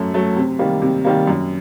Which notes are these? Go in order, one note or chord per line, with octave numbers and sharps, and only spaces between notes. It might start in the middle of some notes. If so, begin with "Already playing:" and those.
Already playing: F#2 F#3 A3
F#3 A3
C3
D#3 G3 A#3
C3
D#3 G3 A#3
F#2